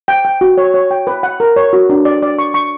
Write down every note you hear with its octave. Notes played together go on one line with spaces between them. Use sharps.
G5
G5
F#4
C#5
C#5
G5
B4
F#5
A#4
C#5
F#4
D4
D5
D5
C#6
C#6